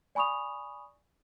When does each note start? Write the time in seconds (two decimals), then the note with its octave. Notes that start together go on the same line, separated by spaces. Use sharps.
0.15 D5 G#5 B5 C#6 D#6 F7